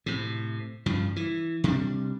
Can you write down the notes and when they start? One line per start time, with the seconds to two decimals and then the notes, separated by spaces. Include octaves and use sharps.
0.06 A2 C3
0.86 G2 C#3 F3
1.16 E3
1.64 C3 G3 B3 D4